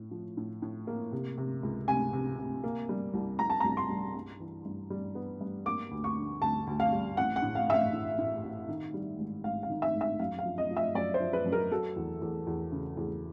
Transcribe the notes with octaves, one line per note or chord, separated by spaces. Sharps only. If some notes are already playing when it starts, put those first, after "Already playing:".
Already playing: A2
F3
A2
A2
A#3
C3
C3
C#2
C3 G#5
C3
C3
A#3
G3
C2
C2 A#5
A5
C2 A#5
C6
G3
G2
E3
G2
G3
B3
G2
A#3 D6
D2
C#6
D3
D2 A5
D2
F5
G3
A1 F#5
F#5
A2
F5
A1 E5
F5
A2
A2
A1
D#3
G3
G#1
G#1 F5
F5
D#3
E5
G#1
E5
F#2 F5
F5
F3
D#5
F3
E5
F#2 D5
C5
F3
B4
F#2
A#4
F#3 A4
E2
E2
E2
C#3
E2